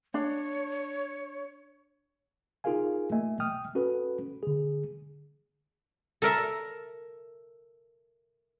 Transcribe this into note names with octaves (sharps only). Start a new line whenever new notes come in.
D4 C#5
D#4 F4 G#4 A#4 F5 G#5
A3 A#3 D#5 E5 G#5
G5 D#6 F6
C#4 F#4 A4 B4
D3 G#4
A4 A#4 E5